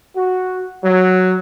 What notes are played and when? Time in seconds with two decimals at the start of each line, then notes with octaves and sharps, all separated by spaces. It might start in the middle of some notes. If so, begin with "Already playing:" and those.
0.15 F#4
0.83 F#3